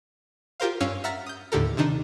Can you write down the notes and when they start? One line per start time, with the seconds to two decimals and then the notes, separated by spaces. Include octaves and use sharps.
0.60 F4 G4 A#4 C5 F5
0.80 G2 C#4 C#5 F5 E6 C#7
1.04 E5 F#5 A#5 F6 A6 B6
1.26 D#6 G6
1.52 D#2 A2 D3 G4 A4 A#4
1.77 C3 D#3 D4 D#4